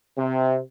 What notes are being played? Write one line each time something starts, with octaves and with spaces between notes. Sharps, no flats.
C3